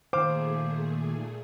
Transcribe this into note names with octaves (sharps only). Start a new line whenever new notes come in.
A#2 D#3 A3 G#4 C5 F5 D6